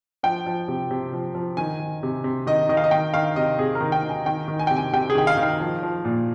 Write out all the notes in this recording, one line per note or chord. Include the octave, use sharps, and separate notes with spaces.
F3 G5
F3
C3
C3
F3
F3
D#3 G#5
D#3
C3
C3
D#3 D#5
D#3 D#5
F5
D#5
D#3 G5
D#3 F5
C3 D#5
C3 G#4
A#4
D#3
G5
D#3
G#5
D#3 G5
D#3
G#5
G5
C3
G#5
C3 G5
G#4
D#3 G5
F5
D#3
F5
F3
F3
A#2